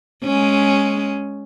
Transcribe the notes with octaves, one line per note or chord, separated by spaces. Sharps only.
G#3 C#4